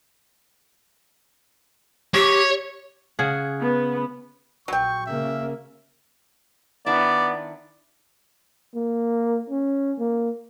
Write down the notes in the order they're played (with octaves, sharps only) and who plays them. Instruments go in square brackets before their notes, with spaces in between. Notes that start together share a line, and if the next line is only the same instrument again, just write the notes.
[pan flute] G4 [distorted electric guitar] C#5
[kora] C#3 G#4 F#5
[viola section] B3
[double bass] A#1 [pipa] F#3 G5 [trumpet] C#6
[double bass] C#3 A#3 [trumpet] E5
[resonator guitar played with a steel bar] D#3 D4 E4 [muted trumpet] B3 [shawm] D5
[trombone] A#3
C#4
A#3